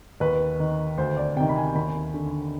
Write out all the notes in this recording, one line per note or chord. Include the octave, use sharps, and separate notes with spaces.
D#2 B4
D#3
D2 C5
D5
C3 D#3 G5
B5
G#5
D#2 B5
D3